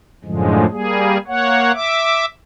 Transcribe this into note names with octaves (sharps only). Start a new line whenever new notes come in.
F#2 A2 D3 F3 G#3
G3 A#3 G#4
A#3 C#5 F#5
E5 D6